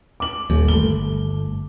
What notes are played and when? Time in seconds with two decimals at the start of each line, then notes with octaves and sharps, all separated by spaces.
0.20 D6 F#7
0.50 D#1 D#2
0.68 G1 A3 G7